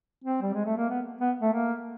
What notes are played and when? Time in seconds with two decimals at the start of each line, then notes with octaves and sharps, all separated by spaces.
0.25 C4
0.42 G3
0.54 G#3
0.66 A3
0.77 A#3
0.90 B3
1.21 B3
1.42 A3
1.54 A#3